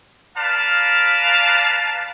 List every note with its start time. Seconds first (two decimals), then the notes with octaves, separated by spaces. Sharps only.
0.36 A#4 B4 D5 F5 A5